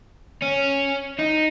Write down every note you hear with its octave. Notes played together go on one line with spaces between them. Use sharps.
C#4
D#4